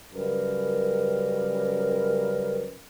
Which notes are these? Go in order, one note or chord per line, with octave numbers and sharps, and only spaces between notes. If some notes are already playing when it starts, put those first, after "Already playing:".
F#2 C#3 G3 A#4 B4